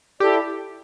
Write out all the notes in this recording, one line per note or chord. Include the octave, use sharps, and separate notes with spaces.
E4 G4 A4 D5